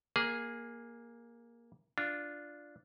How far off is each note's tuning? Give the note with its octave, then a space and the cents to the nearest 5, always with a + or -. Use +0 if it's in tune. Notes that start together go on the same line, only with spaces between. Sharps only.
A#3 +10 G#4 -5
D4 +0 F4 +0